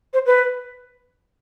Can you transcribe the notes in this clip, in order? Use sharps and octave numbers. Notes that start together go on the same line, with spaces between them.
C5
B4